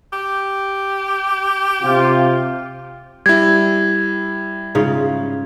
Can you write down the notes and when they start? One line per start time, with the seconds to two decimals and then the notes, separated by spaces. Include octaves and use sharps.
0.13 G4
1.83 C3 F4
3.26 G3 E4 G#6
4.75 G#2 C#3 F4